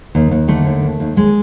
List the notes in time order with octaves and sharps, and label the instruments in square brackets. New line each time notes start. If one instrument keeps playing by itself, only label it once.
[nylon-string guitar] D#2
D#2
D3 A3
D#2
D#2
D#2
D#2 G#3